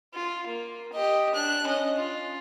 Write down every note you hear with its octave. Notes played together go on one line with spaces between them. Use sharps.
F4
A#3
G4 D#5
D4 F#6
C#4 D#5
F4